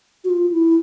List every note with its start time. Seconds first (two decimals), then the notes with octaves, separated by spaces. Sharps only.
0.24 F#4
0.30 F4
0.52 E4